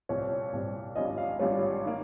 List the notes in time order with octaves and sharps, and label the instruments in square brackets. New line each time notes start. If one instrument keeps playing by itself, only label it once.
[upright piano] C2 A#2 G3 C4 [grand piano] C#5
[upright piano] C2 A#2 G3 C4
[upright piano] G#1 G2 G3 C#4 F4 [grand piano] D#5
[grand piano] F5
[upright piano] G#1 G2 G3 C#4 F4 [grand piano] C#5
[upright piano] D#3 A#3